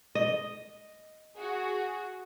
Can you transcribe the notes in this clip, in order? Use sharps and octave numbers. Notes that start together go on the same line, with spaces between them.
D#5
F#4 G#4